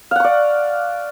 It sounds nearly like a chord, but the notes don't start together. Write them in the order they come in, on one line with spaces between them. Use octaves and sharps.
F5 F#5 C#6 D5